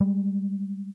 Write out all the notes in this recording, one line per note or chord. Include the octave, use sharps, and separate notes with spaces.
G3 G#3